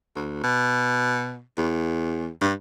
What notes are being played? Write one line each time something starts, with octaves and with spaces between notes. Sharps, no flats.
D2
B2
E2
G2